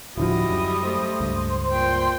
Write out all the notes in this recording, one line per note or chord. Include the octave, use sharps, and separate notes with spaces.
D1 D3 F3 G3 E4 F#4 D#5
F#2
A3 C5
C#2 G2
A#2 G5 C6